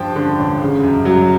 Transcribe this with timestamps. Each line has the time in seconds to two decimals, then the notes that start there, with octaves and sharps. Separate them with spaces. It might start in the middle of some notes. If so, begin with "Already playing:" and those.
Already playing: G2 F3 G5 A5
0.16 D3
0.39 A1
0.61 C#3
0.83 F#2
1.05 F#3